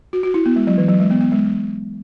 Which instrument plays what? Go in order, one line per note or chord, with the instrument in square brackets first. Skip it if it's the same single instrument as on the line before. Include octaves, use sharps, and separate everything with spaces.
[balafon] F#4
F#4
E4
B3
G#3
F#3
E3
F#3
G#3
B3
B3
G#3